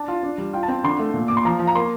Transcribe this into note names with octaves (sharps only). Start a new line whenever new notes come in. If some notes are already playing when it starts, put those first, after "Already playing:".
Already playing: D4 A5
F4
D4
G3
F4 G5
A5
C4 G5
D3 C6
A3
A#2
A#2 D6
C6
F3 A#5
F3
A#5
A#3 C6